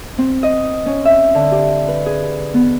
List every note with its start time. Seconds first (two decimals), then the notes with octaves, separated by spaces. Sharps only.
0.18 C4
0.43 D#5
0.86 C#4
1.05 E5
1.35 D3
1.52 G4
1.88 B4
2.06 G#4
2.54 B3